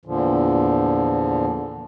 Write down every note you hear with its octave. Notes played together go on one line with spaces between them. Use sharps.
E2 A#2 D3 F3